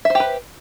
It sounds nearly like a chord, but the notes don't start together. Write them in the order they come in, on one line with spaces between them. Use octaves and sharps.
E5 C5 G4 B4